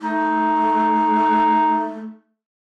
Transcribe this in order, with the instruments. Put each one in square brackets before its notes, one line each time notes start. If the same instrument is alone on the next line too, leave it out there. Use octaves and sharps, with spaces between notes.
[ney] A3 [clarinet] D#4